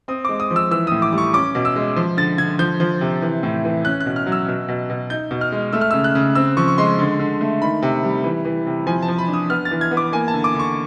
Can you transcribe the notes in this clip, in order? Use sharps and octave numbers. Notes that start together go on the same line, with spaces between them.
C4 D#6
G#3 D6
D#6
F3
E6
E3 E6
A2 D#6
D6
G3
C#6
C#4 D6
B2
E6
G#3
F3
D3 A6
D3 G#6
F3 G6
F3
C3
E3
A2
E3
C#4 F#6
F#6
B2
F6
F#3
E6
B2
B2
B2
D#4 G6
B2
F6
G#3
A3 E6
F6
C#3 E6
F#6
C#3
C4 E6
F3 C#6
C#6
G#3 C6
D3
D3
A3
D#3 B5
C3
G3
E3
E3
C3
F3 G#5
A5
F3
B5
D4
D#6
B3 F6
A6
E3
G#6
B3
D6
A#3 G#5
A5
D3
D6
D3 C#6